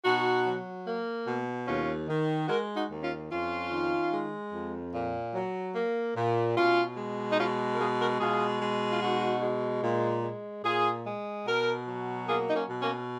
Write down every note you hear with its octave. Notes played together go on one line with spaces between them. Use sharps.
B2 D#4 F#4
F#3
A#3
B2
D#2 C#4 F4
D#3
G#3 F#4 A#4
D#4 F#4
D#2
C#4 F4
F2 C#4 F4
D#3
G#3
F2
A#2
F#3
A#3
A#2
B2 C#4 F4
G#3
D#4
B2 C#4 F4
A#4
G#3 F4 G#4
F#4 A#4
B2 F4 G#4
G#3
F4
B2 D#4 F#4
G#3
A#2
G#3
A#2 F4 G#4
G#3
B2 F#4 A#4
F#3
A#3 F4 G#4
D#4
A#3 C#4
B2
A#3 C#4